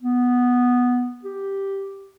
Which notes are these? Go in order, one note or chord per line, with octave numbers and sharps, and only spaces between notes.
B3
G4